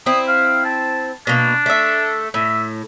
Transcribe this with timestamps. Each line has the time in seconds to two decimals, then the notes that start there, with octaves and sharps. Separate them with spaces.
0.06 C4 E4 D#6
0.27 F5
0.65 A5
1.27 B2 A#3 D4
1.66 A3 E5
2.34 A2 E5